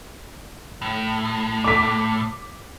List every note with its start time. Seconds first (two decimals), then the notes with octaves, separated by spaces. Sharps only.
0.82 A2
1.64 D6 B6